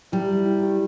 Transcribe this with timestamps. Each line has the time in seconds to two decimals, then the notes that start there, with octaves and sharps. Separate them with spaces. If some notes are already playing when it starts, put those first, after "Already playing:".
0.12 G3 E4
0.29 E4
0.46 E4
0.63 G4